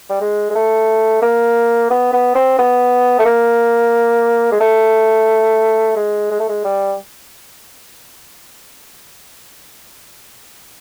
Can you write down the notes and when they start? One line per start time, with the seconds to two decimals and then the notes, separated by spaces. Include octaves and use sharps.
0.10 G3
0.21 G#3
0.50 G#3
0.55 A3
1.22 A#3
1.91 B3
2.13 B3
2.35 C4
2.59 B3
3.19 A3
3.26 A#3
4.52 G#3
4.60 A3
5.96 G#3
6.31 G#3
6.40 A3
6.49 G#3
6.64 G3